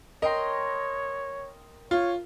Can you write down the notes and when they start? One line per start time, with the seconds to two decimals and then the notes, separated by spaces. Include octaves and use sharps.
0.22 A#4 C#5 D#5 G5 C6
1.91 F4 C#5